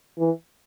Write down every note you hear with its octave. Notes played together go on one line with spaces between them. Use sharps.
E3